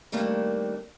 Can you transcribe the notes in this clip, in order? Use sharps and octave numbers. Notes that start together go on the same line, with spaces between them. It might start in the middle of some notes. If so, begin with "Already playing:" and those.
D#3 G3 A3 A#3 C4 D4